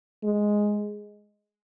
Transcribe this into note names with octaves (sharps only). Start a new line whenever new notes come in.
G#3